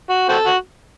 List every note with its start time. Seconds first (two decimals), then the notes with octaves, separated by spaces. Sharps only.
0.10 F#4
0.29 C4 F#4 A4
0.46 F#4